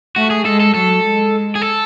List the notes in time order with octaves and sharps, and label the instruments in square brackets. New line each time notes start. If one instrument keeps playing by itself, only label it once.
[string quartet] A3 [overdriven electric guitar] F#4
[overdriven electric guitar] G#4
[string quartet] G#3 [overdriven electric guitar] A4
[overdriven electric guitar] A4
[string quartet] F#3 [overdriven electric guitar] A4
[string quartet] G#3
[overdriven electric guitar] G#4
A4